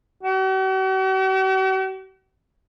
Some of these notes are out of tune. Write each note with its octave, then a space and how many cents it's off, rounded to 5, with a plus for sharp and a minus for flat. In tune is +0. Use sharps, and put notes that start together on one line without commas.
F#4 +45